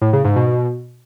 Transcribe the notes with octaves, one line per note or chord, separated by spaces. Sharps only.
A2
C#3
G#2
B2